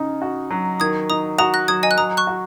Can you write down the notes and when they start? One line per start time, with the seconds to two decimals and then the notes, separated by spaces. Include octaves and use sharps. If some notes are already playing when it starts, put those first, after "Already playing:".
Already playing: C#3 D#4
0.22 F#4
0.50 F#3
0.80 D#3 D#6 G#6
1.10 D#4 A#5 D#6
1.38 F#4 A#5 D#6
1.54 F#6 A#6
1.68 F#3 D#6 G#6
1.83 D#5 G#5
1.91 F#6
1.98 F#3 A#5 D#6
2.17 C#6 F#6
2.27 F#4